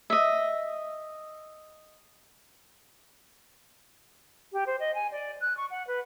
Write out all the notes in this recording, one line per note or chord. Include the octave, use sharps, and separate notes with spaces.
D#5 E5
G4
C5
D#5
G#5
D5
F#6
C#6
F#5
B4